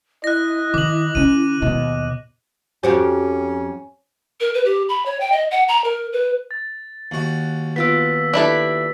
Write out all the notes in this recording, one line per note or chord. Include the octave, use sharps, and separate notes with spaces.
E4 D#5 F#6 A#6
D#3 D6 F#7
D3 C#4 D#7
D#2 B2 D#5
F2 C#4 F#4 G4 C5
A#4
B4
G4
B5
C#5
G5
D#5
F#5
A#5
A#4
B4
A6
D#2 F#4
B3 F4 D6 E6 B6
D4 E4 G4 A4 B4